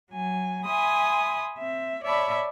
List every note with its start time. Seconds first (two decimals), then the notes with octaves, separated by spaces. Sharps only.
0.12 F#3 G#5
0.65 E5 G#5 B5 C6 D#6
1.59 C4 E5
2.04 C#5 D5 E5 A5 B5